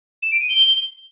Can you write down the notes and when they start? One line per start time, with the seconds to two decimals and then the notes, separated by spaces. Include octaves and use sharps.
0.22 E7
0.31 D7
0.40 D#7
0.49 G7